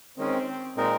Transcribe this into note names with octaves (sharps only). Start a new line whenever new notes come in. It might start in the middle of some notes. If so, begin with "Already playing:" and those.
D#3 G#3 C4 C#4
A#2 G#3 C4 D#4 A#4